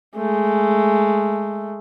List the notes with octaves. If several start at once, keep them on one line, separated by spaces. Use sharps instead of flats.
G#3 A3